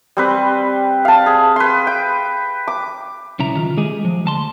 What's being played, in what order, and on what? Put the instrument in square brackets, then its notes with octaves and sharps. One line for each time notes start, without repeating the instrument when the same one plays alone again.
[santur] G3 C4 B4
F5 A5
G#4
B4 C6
G5
D6
[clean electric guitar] B1 C#3 E4 A#5
D#3 F4
G#3 G4 G#4 G#5
F3
D2 A5 C6